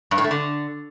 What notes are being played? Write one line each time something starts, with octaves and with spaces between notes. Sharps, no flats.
G2
A2
A3
D3